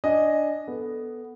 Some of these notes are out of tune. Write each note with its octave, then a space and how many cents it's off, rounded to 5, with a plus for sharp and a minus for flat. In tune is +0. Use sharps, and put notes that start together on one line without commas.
D4 -5 D#5 +0 G#5 +0
B3 +0 A4 +0